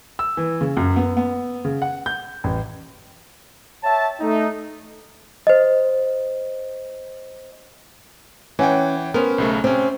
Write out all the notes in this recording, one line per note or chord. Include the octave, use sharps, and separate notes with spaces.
E6
E3
C#3
F#2
B3
B3
C#3
F#5
G6
A1
C#5 E5 G5 A5
A3 D#4
C5 D#5
E3 C#4 F#5 G5
B3 C#4 A#4 C5
B1 C#3 A3
C3 C4 C#4